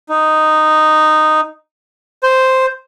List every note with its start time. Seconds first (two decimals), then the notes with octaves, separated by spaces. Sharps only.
0.09 D#4
2.23 C5